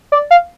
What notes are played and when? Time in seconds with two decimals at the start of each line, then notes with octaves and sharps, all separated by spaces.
0.12 D5
0.31 F5